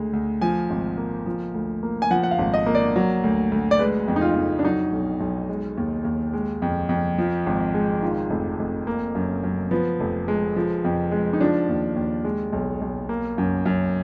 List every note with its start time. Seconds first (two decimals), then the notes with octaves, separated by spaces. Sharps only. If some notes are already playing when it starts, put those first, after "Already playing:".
Already playing: D2 G#3
0.13 D2
0.42 F3 G#5
0.70 G#1
0.97 A#3
1.26 F3
1.54 D2
1.83 A#3
2.02 G#5
2.11 F3 F#5
2.23 F#5
2.31 F5
2.39 G#1
2.54 D#5
2.66 A#3
2.75 D5
2.96 F#3
3.24 D2
3.52 D2
3.71 D5
3.79 G#3 B4
4.08 F2
4.16 D#4
4.21 F4
4.36 F2
4.59 D4
4.64 F#3 D#4
4.92 B1
5.20 B1
5.49 G#3
5.77 D#2
6.05 D#2
6.33 G#3
6.62 F2
6.89 F2
7.18 F3
7.47 G#1
7.74 G#3
8.03 D#3 F4
8.30 F1
8.59 F1
8.87 A#3
9.15 F#2
9.43 F#2
9.71 F3 B3
10.00 F1
10.28 G#3
10.56 F3
10.85 F2
11.12 G#3
11.33 D#4
11.40 F3 D4
11.69 D#2
11.96 D#2
12.24 G#3
12.52 B1
12.81 B1
13.09 A#3
13.38 F#2
13.66 F#2